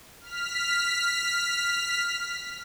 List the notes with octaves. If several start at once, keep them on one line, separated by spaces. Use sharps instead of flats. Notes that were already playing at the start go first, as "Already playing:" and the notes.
F6 B6